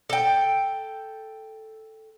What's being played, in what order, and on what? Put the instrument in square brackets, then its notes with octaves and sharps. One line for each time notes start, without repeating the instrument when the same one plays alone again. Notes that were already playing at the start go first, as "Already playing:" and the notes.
[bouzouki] A4 G5